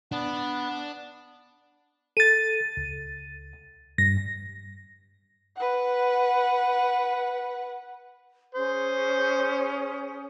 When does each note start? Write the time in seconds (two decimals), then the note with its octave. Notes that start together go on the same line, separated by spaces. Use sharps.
0.12 B3 D4
2.17 A4 A6 D#7
2.77 C#2
3.98 G2 A#6
5.56 B4 F#5
8.55 C#4 G#4 C5 D#6